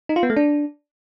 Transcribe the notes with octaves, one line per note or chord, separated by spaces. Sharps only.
D#4
F4
B3
A3
D4